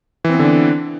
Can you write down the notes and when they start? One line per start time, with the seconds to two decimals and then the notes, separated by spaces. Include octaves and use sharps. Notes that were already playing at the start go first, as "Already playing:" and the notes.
0.25 E3
0.29 C4
0.34 B3
0.39 D3
0.44 D4